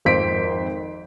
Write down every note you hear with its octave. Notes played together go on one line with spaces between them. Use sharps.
G#1 F2 C5 B6 D7